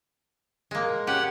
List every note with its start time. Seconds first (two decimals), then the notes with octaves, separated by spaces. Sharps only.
0.71 G#3 A#3
1.07 C#4 G4 F#5